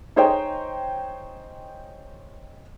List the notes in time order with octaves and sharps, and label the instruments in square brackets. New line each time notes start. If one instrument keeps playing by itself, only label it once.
[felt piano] D#4 G#4 C5 C#5 D#5 G5